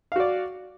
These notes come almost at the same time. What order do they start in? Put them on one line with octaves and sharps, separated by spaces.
F5 F#4 D5